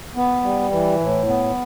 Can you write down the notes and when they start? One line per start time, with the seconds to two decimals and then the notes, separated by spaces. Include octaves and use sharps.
0.16 B3
0.44 G3
0.71 E3
1.00 A2
1.28 B3